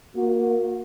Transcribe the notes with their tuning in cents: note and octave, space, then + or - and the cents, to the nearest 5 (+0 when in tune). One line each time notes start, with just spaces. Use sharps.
A#3 +0 F#4 -30